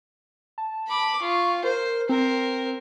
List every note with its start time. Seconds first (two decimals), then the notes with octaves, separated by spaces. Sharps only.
0.58 A5
0.88 B5 D6
1.22 F4 C#6
1.64 A#4 C5
2.09 C4 A#4 C5